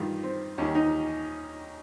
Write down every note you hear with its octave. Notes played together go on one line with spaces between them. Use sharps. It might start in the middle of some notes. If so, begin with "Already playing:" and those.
Already playing: G2 D#3 G3 D#4 F4
C4
D#2 D#3 G3 C#4
D#4